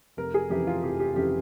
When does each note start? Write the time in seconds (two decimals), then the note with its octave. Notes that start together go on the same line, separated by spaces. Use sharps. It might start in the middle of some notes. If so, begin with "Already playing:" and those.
0.17 F1 A#4
0.34 G#4
0.50 F2 C#3 E3 G4
0.67 F4
0.83 F1 G4
0.99 G4
1.16 F2 C#3 E3 G4